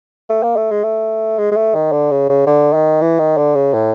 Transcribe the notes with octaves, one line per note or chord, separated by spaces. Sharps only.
A3
A#3
A3
G#3
A3
G#3
G#3
A3
D#3
D3
C#3
C#3
D3
D#3
E3
D#3
D3
C#3
A2